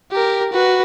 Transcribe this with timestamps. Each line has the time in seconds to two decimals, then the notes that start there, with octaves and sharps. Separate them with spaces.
0.12 G4 A#4
0.53 F#4 B4